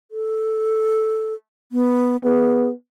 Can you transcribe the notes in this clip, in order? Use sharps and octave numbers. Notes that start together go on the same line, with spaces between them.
A4
B3
B3 G#4